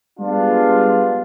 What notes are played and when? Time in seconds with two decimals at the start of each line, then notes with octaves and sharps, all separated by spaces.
0.19 G3 G#3 B3 D4 F4